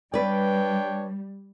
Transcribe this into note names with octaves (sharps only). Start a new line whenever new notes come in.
G3 D4 B4 C#5 D5 G5